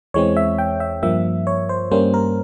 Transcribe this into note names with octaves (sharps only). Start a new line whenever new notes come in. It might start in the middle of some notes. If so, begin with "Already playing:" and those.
E2 E3 G#3 C4 C#5
E5
G5
E5
G2 F3 A#3 E5
C#5
C5
G2 G3 A#3 C#4 C5
A#4